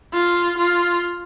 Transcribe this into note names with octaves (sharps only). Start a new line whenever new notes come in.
F4
F4